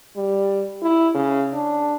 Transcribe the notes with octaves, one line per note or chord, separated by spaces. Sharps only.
G3
E4
C#3
D4